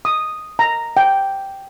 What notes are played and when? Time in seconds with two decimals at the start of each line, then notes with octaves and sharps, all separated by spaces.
0.05 D#6
0.59 A#5
0.97 G5